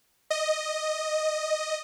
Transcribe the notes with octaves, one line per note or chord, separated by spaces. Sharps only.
D#5